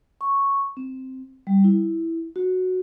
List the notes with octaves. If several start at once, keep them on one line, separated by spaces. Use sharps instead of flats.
C#6
C4
G3
E4
F#4